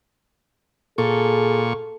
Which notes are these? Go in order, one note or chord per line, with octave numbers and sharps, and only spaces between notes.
A#2 G#4 A4 C#6